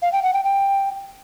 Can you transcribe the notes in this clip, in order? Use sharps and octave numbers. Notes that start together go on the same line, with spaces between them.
F5
G5
F#5
G5
G5